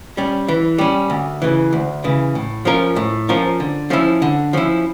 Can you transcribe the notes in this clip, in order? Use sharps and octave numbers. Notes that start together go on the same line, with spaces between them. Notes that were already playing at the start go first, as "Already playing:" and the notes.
G3 C#4
E3
G3 C#4
D2
C#3 E3
D2
C#3 E3
A2
F3 C#4 F4 A#4
A2
F3 C#4 F4 A#4
D3
F3 C#4 E4
D3
F3 C#4 E4